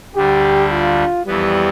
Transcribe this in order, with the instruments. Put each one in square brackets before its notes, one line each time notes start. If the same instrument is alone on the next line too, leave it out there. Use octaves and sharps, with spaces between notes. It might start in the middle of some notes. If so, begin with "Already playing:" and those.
[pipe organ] D2 D3 G3 [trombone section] G4
[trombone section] F4
[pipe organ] F2 E3 B3 [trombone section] G3